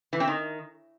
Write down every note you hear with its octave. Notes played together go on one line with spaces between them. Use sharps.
E3
C4
D#3